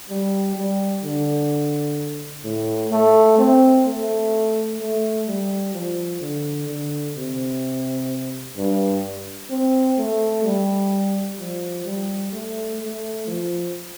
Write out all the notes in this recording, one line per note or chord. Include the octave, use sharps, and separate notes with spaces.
G3
G3
D3
A2
A3
C4
A3
A3
G3
F3
D3
D3
C3
G2
C4
A3
G3
F3
G3
A3
A3
F3